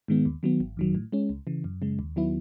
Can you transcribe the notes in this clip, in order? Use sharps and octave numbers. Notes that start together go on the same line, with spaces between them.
G#2 D#3 G#3 B3
D#2
D#3 F#3 B3
G#1
F#2 D#3 F#3
A2
G#3 C#4
C#2
C#3 E3
F#2
C#3 G#3
D#2
D#3 F#3 B3 E4